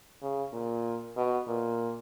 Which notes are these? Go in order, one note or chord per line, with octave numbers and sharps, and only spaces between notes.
C#3
A#2
B2
A#2